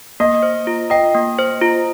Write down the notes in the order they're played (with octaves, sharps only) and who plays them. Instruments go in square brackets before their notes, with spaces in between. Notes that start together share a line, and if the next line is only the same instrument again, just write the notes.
[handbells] A#3 [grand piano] D#5
[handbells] C5
F4
[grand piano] D#5 [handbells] G5
[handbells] A#3
C5
F4